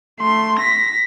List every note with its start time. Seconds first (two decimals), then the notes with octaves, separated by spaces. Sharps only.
0.20 A3 C6
0.59 A#6 B6